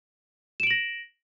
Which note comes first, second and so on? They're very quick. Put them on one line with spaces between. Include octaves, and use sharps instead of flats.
E7 D7 F#7 A#6